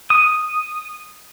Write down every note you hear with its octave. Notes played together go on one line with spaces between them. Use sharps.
D#6